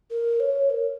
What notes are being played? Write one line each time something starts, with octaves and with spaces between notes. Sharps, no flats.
A#4
C#5
A#4